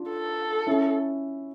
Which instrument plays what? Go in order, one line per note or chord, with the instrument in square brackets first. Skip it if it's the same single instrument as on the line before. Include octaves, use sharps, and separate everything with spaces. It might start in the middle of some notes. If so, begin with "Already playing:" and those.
Already playing: [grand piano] D4 F4
[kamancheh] A4
[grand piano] C#4 E4